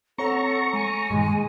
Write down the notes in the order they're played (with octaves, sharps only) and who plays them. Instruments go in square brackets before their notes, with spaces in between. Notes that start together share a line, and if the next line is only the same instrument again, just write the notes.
[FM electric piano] C4 C#5 F#5 [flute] A4 [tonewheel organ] A#5 C#6
[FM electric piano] G#3 [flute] G#5
[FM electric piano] G2 A#2 D#3 [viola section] G#3